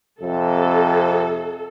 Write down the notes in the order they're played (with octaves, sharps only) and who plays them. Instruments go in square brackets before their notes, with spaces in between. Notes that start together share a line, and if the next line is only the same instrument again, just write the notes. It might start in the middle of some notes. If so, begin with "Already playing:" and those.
[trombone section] F2 C3 [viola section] A4